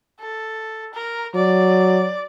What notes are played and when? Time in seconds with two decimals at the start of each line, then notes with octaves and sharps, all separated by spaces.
0.20 A4
0.94 A#4
1.35 F#3 D5